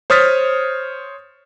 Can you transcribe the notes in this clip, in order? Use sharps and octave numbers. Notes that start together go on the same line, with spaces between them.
C5 C#5 D#6 F6 A6 B6